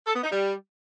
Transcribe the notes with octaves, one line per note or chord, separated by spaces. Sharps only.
A4
B3
D#4
G3